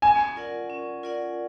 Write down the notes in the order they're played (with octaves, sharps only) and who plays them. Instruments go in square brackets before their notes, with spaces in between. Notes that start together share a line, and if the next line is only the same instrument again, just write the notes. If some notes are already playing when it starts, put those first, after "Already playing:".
[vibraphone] C#4 [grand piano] G#5
[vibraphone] F4 A#4 D5 F#5
C#4
F4 A#4 D5 F#5